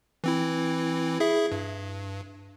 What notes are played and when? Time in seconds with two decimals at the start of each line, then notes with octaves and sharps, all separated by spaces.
0.24 E3 C4 E4
1.20 E4 G#4 E5
1.52 G2